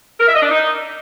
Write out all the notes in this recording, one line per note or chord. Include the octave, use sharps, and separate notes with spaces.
A#4
E5
D#5
D4
D#4